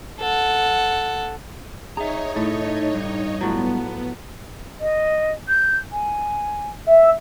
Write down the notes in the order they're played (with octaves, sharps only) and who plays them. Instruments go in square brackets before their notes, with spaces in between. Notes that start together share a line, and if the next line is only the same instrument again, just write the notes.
[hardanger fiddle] A4 F#5
[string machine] D#4 C#5 D#5 [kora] G#4 [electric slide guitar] E5 A#5
[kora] A2 [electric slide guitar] A3
[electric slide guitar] G2
[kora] A2 F3 F#3 [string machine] B3
[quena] D#5
G6
G#5
[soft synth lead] E5